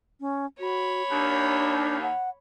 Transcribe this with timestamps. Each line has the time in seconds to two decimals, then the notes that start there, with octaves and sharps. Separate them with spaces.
0.20 C#4
0.60 F#4 C#5 B5
1.11 D#2 D4
2.02 F#5